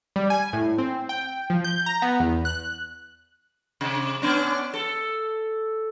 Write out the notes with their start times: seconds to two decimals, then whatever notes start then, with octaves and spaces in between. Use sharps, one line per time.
0.16 G3
0.30 G#5
0.53 A2
0.78 C4
1.09 G5
1.50 F3
1.64 G6
1.86 A#5
2.02 B3
2.20 E2
2.45 F#6
3.81 C3
4.22 B3 C#4 D4
4.74 A4